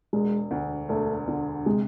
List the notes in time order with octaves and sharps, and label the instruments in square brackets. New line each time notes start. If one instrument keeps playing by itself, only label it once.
[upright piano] E1 [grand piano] G#3
[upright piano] D2
[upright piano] E1 [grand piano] A3
[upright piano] D3
[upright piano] C3 [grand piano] G#3